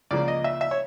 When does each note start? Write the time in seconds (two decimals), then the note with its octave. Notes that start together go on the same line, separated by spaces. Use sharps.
0.11 C#2 C#3 F3 A#3 D5
0.28 D#5
0.44 E5
0.61 E5
0.71 C#5